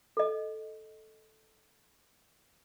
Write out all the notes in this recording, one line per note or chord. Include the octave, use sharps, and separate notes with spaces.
A4 D#5